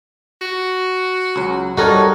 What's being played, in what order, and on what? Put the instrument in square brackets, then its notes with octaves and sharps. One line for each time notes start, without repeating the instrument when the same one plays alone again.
[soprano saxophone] F#4
[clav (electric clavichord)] C#2 F#3
[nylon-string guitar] G3 A4 [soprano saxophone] D#4 [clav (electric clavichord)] F#4 A#4 C#5